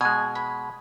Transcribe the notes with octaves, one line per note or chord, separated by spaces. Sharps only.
B2 G#3 G#5
B5